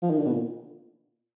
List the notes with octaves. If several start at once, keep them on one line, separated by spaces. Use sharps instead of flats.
F3
D#3
D3
B2
A#2